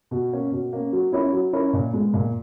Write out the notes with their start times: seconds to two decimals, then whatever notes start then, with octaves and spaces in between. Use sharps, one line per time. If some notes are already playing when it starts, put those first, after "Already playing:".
0.11 B2
0.32 A#3 C#4
0.51 B2
0.73 A#3 C#4
0.93 F#3
1.12 C#4 E4 A#4 C#5
1.33 F#3
1.53 C#4 E4 A#4 C#5
1.73 A#2
1.93 G#3 B3
2.14 A#2